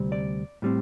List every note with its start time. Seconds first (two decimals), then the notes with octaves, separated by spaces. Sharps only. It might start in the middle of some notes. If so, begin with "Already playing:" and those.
Already playing: D2 C3 G3 C4
0.12 D5
0.62 A2 G3 C4